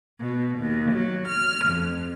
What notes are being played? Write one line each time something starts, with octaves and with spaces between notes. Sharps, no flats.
B2
D#2
F#3
F6
F2